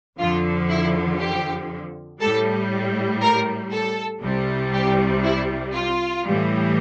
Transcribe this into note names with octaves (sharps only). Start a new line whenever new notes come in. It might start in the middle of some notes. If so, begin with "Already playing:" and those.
F2 D3 F3 F4
E4
G4
A2 G3 A4
A#4
A4
C2 C3 G3
G4
E4
F4
A2 E3 G3